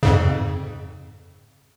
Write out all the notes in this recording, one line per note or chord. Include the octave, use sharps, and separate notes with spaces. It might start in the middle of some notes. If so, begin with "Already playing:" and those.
F2 G#2 C#3